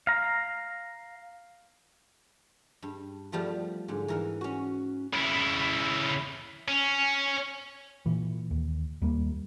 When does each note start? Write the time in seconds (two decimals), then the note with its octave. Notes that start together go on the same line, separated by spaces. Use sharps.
0.07 F5 A#5
2.82 G2
3.32 F3 G3 A3 B3
3.88 G#2 D3
4.08 E3 A#4 F#5
4.41 C#4 F#4
5.13 C#3 E4
6.68 C#4
8.06 A#2 E3
8.51 D#2
9.02 D#2 G3 A#3